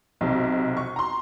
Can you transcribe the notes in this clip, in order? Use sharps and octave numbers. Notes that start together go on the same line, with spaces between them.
B1 C3
C#6
A#5 C6